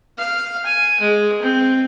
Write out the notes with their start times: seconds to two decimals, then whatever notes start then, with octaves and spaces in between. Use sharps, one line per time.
0.18 F5
0.65 G#5
1.00 G#3
1.42 C4